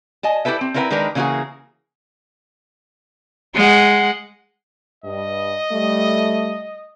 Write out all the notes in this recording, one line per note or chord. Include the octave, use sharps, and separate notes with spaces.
D#5 G#5 A5
E4 G4 A4 B4 E5
C4
C4 E4 A#4 B4 E5 G5
D#3 G#3 D4 A#4 B4 A#5
C#3 E3 A#3 F4 F#4 G#4
G#3 F#5 C6
G2 D#5
G3 A3